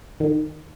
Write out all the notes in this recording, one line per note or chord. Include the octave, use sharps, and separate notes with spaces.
D#3